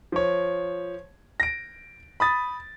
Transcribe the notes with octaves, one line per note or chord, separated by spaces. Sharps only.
F3 C#5
A#6 D7
B5 D#6 A6